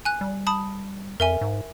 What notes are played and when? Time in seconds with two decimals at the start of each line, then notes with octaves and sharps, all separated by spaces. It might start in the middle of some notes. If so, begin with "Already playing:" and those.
0.05 G#5 F#6
0.21 G3
0.47 A5 B5 D#6
1.20 F2 A#4 E5 G#5
1.41 G#2